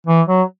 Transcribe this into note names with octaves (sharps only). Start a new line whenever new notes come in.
E3
F#3